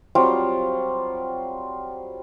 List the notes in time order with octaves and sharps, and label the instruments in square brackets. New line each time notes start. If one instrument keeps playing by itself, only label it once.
[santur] F#3 G3 C4 F4